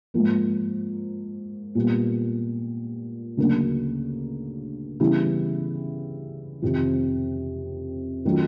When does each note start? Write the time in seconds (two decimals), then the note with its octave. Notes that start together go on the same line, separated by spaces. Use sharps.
0.14 G#2 F3 A#3
1.75 A#2 G3 B3
3.37 D2 C#3 F#3 A#3 D4
5.00 C#3 E3 G3 B3 E4
6.62 F2 C3 D#3
8.25 D#3 F#3 A3 C#4 F4